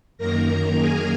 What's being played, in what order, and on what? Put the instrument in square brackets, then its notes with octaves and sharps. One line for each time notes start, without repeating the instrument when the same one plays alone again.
[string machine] F#2 D#3 A#3 A#4 A#5
G#4 G#5